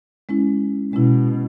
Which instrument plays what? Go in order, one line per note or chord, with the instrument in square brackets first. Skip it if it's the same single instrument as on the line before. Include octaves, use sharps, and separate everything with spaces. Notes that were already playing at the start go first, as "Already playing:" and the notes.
[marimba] G#3 C#4 E4
[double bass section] B2 [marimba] G#3 C#4 E4